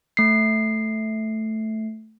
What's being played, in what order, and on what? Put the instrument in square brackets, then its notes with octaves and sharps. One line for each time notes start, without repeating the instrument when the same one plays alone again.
[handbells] A3 C7